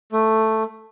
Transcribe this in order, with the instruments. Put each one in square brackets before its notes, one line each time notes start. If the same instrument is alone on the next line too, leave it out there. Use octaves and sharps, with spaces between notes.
[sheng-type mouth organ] A3